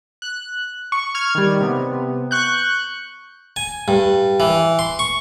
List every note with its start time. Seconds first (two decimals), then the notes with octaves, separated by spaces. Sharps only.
0.22 F#6
0.92 C#6
1.15 F6 G#6
1.35 D#3 G3
1.61 C3 B3
2.31 C#6 F#6 G6
3.56 G#5
3.88 G2
4.40 E3
4.79 C6
4.99 C#6